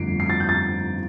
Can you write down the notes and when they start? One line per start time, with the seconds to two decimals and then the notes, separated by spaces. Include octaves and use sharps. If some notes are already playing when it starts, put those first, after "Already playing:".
Already playing: G1 F2 F3 A3 C7 D7
0.20 C7
0.30 A6
0.40 G6
0.49 A6